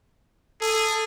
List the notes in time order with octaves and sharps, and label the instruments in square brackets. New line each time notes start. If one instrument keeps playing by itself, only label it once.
[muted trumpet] G#4 [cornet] A4